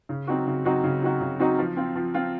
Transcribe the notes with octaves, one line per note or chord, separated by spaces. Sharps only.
C#3
F#3 C4 D#4 F#4
C#3
F#3 C4 D#4 F#4
C#3
F#3 C4 D#4 F#4
C#3
F#3 C4 D#4 F#4
F3
C4 F4
F3
C4 F4